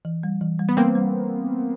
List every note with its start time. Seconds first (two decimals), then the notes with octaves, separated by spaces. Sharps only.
0.05 E3
0.23 G3
0.41 E3
0.59 G3
0.69 B3
0.77 G3 A#3 C4
0.95 G3